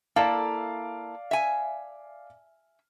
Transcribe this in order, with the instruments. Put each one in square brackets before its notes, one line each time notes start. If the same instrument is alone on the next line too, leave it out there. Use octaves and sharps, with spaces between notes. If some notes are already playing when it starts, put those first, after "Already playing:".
[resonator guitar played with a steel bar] A#3 E4 A4 [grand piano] D5 F5
[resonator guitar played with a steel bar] E5 G#5